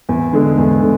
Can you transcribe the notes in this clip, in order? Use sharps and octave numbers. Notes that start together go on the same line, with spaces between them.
E2
D3 G#3
E2
D3